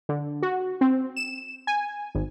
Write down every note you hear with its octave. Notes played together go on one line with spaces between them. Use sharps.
D3
F#4
C4
E7
G#5
G#1